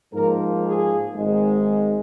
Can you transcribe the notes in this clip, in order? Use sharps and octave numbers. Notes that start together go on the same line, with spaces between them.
G#2 F3 A#3 A#4
G#4
G#1 G#2 G#3